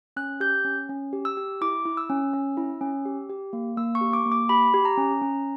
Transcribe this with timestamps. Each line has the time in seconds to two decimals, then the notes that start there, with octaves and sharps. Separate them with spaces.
0.16 C#4 F#6
0.40 G4 G6
0.65 C#4
0.89 C#4
1.13 G4
1.25 E6
1.37 G4
1.61 E4 D6
1.85 E4
1.97 E6
2.10 C#4
2.34 C#4
2.57 E4
2.81 C#4
3.05 G4
3.30 G4
3.53 A#3
3.77 A#3 E6
3.95 C#6
4.01 G4
4.13 D6
4.25 A#3
4.32 D6
4.49 G4 B5
4.74 G4
4.85 A#5
4.98 C#4
5.22 C#4